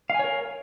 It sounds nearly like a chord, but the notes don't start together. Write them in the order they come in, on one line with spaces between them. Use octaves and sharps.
F5 G#5 C#5 A#4